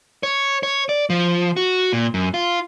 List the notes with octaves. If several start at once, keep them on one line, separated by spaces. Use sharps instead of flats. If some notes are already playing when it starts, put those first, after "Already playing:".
C#5
C#5
D5
F3
F#4
A#2
F#2
F4